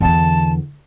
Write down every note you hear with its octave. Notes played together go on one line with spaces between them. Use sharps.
E2 D3 A5